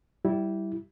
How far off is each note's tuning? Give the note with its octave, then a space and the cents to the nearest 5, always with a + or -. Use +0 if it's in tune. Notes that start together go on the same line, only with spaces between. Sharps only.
G3 -15 E4 -5